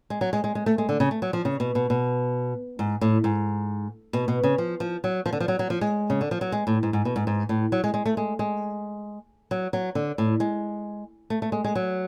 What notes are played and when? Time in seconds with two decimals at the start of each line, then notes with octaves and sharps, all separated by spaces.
0.10 G#3
0.21 F#3
0.33 G#3
0.44 G#3
0.55 G#3
0.66 A3
0.78 G#3
0.89 D3
1.00 C#3
1.11 A3
1.22 F#3
1.33 F3
1.45 C#3
1.60 B2
1.75 B2
1.90 B2
2.79 G#2
3.01 A2
3.24 G#2
4.13 B2
4.28 B2
4.43 C#3
4.58 F3
4.80 F3
5.04 F#3
5.26 F3
5.33 D3
5.40 F3
5.48 F#3
5.59 F#3
5.70 F3
5.81 G#3
6.10 C#3
6.21 D3
6.31 F3
6.41 F#3
6.52 G#3
6.67 A2
6.83 G#2
6.93 G#2
7.05 B2
7.16 G#2
7.27 G#2
7.49 A2
7.72 F#3
7.84 G#3
7.94 G#3
8.06 A3
8.17 G#3
8.39 G#3
9.51 F#3
9.73 F#3
9.95 D3
10.18 A2
10.40 G#3
11.30 A3
11.42 A3
11.52 G#3
11.64 G#3
11.75 F#3